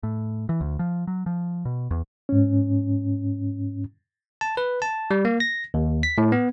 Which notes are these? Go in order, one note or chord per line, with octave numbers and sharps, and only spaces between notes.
A2
E3
D2
F3
F#3
F3
B2
E2
G#2 C#4
A5
B4
A5
G3
A#3
A#6
D#2
B6
A2
B3